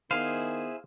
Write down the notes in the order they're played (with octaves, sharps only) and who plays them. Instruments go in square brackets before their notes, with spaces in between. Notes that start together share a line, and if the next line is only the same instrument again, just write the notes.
[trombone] D#3 [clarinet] B3 [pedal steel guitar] E4 G#4 C5 [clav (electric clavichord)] F5